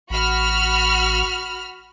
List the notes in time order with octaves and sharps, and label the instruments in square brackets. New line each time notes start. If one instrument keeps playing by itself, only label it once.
[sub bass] A1 [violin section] F#4 B5 F6